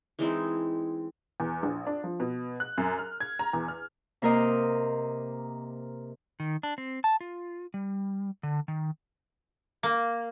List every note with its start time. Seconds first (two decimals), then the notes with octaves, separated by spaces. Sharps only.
0.19 E3 G#3 C4 D#4
1.40 E2
1.63 A#1
1.87 D4
2.04 F3
2.20 B2
2.60 F#6
2.78 F#2
2.99 F6
3.20 G#6
3.39 A#5
3.53 E2
3.68 F6
4.22 C3 A#3 A#4 C5 D#5
6.40 D#3
6.63 D4
6.78 C4
7.04 A5
7.21 F4
7.74 G3
8.43 D3
8.68 D#3
9.83 A#3